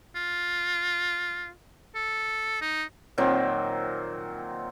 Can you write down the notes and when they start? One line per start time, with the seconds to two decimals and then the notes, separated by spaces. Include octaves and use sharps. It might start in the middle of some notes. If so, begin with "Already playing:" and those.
0.16 F4
1.95 A4
2.61 D#4
3.18 A#2 D#3 F#3 C4